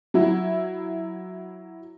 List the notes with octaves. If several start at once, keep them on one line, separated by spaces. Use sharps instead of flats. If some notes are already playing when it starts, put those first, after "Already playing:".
F#3 E4